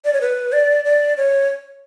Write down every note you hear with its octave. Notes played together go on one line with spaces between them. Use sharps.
D5
C#5
B4
D5
D5
C#5